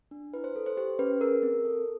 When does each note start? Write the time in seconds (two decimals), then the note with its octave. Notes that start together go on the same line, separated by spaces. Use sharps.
0.11 D4
0.34 E4 B4
0.44 C5
0.56 A4
0.66 C5
0.77 G4 C5
0.99 C#4 B4
1.21 G#4 A#4
1.43 C4
1.65 A4